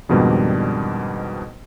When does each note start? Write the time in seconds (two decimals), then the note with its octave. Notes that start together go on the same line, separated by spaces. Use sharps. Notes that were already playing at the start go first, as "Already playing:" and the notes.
0.09 F2 G#2 B2 D#3 G3 D4